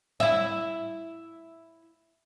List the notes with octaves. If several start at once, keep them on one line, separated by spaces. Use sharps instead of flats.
E4 E5